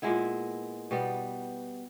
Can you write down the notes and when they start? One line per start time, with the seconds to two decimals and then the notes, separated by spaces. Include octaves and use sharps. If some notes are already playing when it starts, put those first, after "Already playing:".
0.02 A#2 G#3 B3 E4 E5
0.91 B2 G3 B3